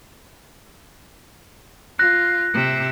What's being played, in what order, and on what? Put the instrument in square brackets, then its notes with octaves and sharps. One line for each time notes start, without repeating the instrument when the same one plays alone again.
[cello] F4 [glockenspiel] F#6 A#6
[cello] C3 E5